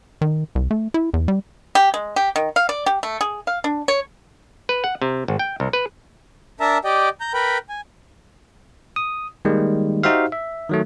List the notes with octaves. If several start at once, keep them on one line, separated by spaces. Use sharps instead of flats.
D#3
C2
A3
E4
E2
G3
G4
G#3
G4
D#3
F5
D5
G4
A3
G#4
F5
D4
C#5
B4
F#5
C3
G#1
G5
C2
B4
D4 A#4 E5 A5 A#5
G4 D5 D#5 G5
A#5 G6
A#4 B4 G5 B5
G#5
D#6
D#3 G3 G#3 A#3
D#4 F#4 G4 C5 E5 F5
E5
D#3 F#3 A3